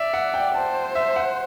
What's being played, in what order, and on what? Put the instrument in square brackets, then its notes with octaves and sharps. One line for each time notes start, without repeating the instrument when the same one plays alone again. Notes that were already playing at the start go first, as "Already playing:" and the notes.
Already playing: [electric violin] D5 [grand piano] E5
[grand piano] F#5
G5
[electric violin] C5 [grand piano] A5
[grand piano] E5
F#5